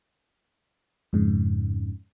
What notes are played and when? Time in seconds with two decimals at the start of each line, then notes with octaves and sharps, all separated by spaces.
1.13 F2 G#2 C#3